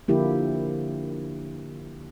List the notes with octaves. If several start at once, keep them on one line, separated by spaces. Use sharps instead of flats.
D3 F3 A#3 E4 G4